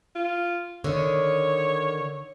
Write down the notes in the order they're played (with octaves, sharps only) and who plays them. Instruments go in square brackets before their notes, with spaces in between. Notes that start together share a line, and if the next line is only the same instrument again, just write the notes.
[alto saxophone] F4
[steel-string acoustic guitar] D3 D#3 [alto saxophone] C#5